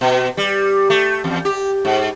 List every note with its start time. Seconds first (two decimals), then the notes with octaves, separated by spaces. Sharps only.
0.01 B2
0.37 G3
0.90 A3
1.24 E2
1.45 G4
1.85 G#2